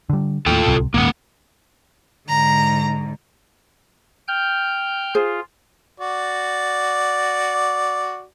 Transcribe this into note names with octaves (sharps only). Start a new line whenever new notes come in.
D3 G3
D#2 A2 F4 A4 G5
D1 C2 C3
D#1 D#2 G#2 A#3 F#5
G#2 D3 A#5
G5 F6 G6
F4 G#4 C5
F#4 D5